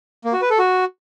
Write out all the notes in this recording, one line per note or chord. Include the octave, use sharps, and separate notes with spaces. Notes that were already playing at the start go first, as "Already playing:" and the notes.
A#3
F#4
B4
A4
F#4